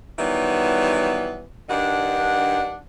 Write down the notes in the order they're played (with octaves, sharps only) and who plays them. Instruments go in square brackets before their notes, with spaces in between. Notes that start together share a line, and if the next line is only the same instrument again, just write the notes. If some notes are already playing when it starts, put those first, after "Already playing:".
[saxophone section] D#3 E3 F#3 G3 B3
G2 D#3 D4 F#5